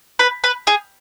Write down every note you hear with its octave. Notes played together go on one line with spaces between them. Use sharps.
B4
B4
G#4